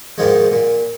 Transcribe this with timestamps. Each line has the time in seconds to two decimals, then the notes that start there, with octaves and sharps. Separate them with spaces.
0.18 G#2 D#3 F3 G#3
0.52 A#2